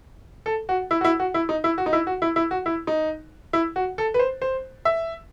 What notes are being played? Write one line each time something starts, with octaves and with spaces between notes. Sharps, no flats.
A4
F#4
E4
F#4
E4
F#4
E4
D#4
E4
F#4
D#4
E4
F#4
E4
E4
F#4
E4
D#4
E4
F#4
A4
B4
C5
C5
E5